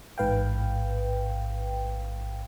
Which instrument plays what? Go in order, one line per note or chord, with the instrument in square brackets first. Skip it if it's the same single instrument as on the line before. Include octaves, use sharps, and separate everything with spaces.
[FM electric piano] A1 G#2 B4 F5 G5